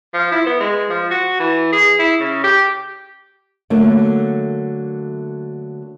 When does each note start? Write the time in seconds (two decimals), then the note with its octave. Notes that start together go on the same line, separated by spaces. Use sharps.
0.14 F3
0.32 E4
0.47 B3
0.61 G#3
0.90 F3
1.11 F#4
1.40 E3
1.72 G#4
1.99 E4
2.20 C#3
2.44 G4
3.70 D3 F#3 A3 A#3